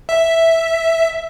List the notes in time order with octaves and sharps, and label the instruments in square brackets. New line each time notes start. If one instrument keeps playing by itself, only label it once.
[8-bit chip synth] E5